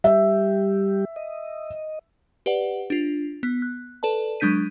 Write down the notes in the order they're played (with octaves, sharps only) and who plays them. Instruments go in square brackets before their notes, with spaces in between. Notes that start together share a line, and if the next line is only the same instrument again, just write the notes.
[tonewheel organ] G3 G4 [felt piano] E5
[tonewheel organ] D#5
[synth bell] G4 B4 D5 F#5
D4 F4
B3
F#6
A4 B4 D5 A5
F#3 G#3 D4 G6 B6 D#7